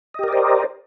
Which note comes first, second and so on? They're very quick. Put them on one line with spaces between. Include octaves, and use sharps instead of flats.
D#5 G4 A#4 D5 C5